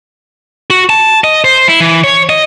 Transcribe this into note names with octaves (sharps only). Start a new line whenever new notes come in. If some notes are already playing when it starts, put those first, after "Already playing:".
F#4
A5
D#5
C5
E4
E3
C#5
D#5